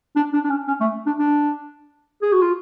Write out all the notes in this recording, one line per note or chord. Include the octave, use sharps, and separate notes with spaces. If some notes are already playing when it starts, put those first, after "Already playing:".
D4
D4
D4
C#4
C#4
A3
D4
D4
G#4
F#4
F4